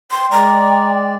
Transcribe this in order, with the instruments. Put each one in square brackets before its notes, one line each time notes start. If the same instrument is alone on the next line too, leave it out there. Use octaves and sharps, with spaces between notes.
[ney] G5 [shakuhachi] C6
[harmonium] G#3 D5 [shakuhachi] A#5